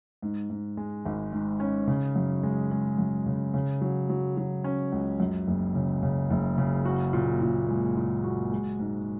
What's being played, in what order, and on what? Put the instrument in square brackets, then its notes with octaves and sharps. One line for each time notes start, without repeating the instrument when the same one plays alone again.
[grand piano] G#2
G#2
G#3
G#1
G#2
C#4
C#3
F#2
G#3
G#3
F#2
C#3
C#3
F#3
F#3
F#3
C#4
C#2
F#2
F#1
C#3
C#3
F#1
C#3
F#4
A#2
A#2
G#3
A#2
F#4
G#3
G#2